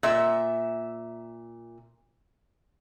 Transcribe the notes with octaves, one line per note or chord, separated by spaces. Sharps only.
A#2 E5